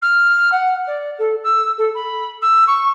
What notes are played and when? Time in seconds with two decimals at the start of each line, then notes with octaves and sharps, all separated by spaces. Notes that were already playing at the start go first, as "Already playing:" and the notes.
0.02 F6
0.52 F#5
0.87 D5
1.18 A4
1.43 E6
1.77 A4
1.94 B5
2.41 E6
2.67 C#6